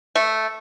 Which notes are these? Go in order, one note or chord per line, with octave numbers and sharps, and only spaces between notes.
A3